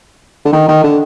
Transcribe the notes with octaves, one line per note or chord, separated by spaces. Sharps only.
D3
D#3
D#3
D3